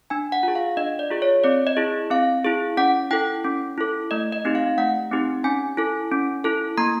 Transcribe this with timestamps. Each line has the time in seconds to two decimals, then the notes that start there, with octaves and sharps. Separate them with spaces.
0.10 D4 G#5
0.32 F#5
0.43 F4 G#4
0.55 F5
0.77 D4 D#5
0.99 D5
1.10 F4 G#4
1.22 C#5
1.44 C4 D5
1.67 D#5
1.77 E4 G#4
2.10 C4 F5
2.45 E4 G#4
2.77 C#4 F#5
3.11 E4 A4 G5
3.44 C#4
3.78 E4 A4
4.11 A3 D#5
4.33 D#5
4.45 C4 D#4 G4
4.55 F5
4.77 A3 F#5
5.11 C4 D#4 G4
5.44 C#4 G#5
5.77 E4 A4
6.12 C#4
6.44 E4 A4
6.78 A#3 A#5